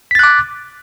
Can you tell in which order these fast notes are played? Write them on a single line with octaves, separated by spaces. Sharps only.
B6 A6 F#6 D6